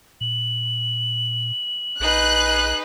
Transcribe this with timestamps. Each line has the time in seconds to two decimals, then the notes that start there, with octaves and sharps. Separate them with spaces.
0.21 A#2 F#7
2.00 A#1 D#4 G#4 B4 F#6